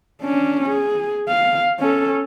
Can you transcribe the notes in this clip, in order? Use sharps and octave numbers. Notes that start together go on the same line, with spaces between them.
C#4 D4
G#4
F5
C#4 A4